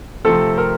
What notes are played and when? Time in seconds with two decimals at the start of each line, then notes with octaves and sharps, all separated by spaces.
0.25 C3 F3 A3 C4 A4
0.58 A#4